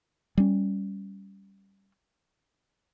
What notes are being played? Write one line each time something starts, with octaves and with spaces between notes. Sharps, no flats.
G3 C#4